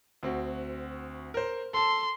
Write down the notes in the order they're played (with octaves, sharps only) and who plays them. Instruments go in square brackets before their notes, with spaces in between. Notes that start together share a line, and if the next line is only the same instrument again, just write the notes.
[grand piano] D2 C4 F#4
A#4 C5
[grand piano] A4 A5 [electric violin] C6